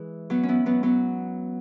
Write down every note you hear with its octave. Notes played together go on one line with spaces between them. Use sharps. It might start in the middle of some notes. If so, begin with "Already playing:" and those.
Already playing: E3 G#3
F#3 B3
C#4
B3 E4
F#3 B3
F#3 B3